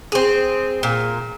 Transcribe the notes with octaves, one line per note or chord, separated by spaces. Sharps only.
C4 G#4
A#2